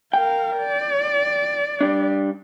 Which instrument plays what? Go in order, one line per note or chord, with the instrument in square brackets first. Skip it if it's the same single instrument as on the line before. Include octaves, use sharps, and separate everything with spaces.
[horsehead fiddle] A#4 F5 [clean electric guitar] G5
[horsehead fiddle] D5
[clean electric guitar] G3 D4